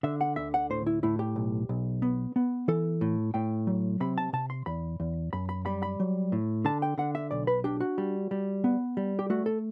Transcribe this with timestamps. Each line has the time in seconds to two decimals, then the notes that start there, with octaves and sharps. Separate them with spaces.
0.03 D3 E5
0.21 F#5
0.36 D2 E5
0.54 F#5
0.70 A2 C5
0.87 E4
1.03 A2 E4
1.19 G4
1.36 B1
1.69 B1
2.02 B3
2.36 B3
2.68 E3 A4
3.01 A2
3.34 A2 G5
3.67 F#3
4.00 C3 B5
4.18 A5
4.33 C3 A5
4.50 C6
4.66 E2 B5
5.00 E2
5.33 F#2 B5
5.49 B5
5.66 G3 B5
5.83 B5
6.00 F#3
6.32 A2
6.65 D3 A5
6.82 G5
6.98 D3 F#5
7.15 E5
7.31 B1 D5
7.47 B4
7.64 D4 G4
7.80 F#4
7.98 G3
8.31 G3
8.64 B3
8.97 G3
9.19 G4
9.30 A3 F#4
9.46 A4